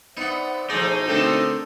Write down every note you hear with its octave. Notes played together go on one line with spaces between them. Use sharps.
B3 D#4 C5 D5 E5 F#5
B2 F3 A3 D#4 E4 G#4 C5 D5
D3 A3 C4 D4 A4 A#4